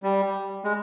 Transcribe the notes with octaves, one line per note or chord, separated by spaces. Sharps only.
G3
G#3